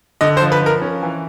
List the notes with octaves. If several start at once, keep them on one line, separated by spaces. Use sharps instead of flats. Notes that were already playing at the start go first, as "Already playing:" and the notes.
D3 D#5
C5
F3
B4
F3
A#4
C#4
E3